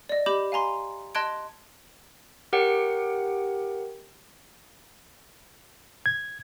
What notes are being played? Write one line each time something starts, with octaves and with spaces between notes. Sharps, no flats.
D5 D#5
G4 D#5 B5 D6 G6 F#7
F5 G#5 A#5 C6
D#5 A5 C6 F#6 G#6 D7
G4 A#4 C#5 F#5 G5
G#6